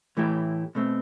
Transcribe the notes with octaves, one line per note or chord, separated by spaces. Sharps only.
A2 E3 A3 E4 G4
B2 A3 C4